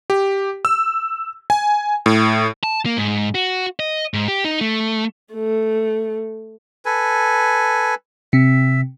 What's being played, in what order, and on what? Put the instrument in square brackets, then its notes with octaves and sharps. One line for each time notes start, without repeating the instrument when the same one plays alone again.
[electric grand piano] G4
E6
G#5
A2
[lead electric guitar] A5
A#3
G#2
F#4
D#5
G#2
G4
D#4
A3
[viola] A3
[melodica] A4 B4 G#5
[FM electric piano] C3 [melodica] E5